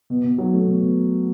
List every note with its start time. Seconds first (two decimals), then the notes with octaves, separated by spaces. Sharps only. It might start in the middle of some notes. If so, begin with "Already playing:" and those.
0.10 B2
0.24 B2
0.38 F#3
0.53 A3
0.68 B2
0.83 B2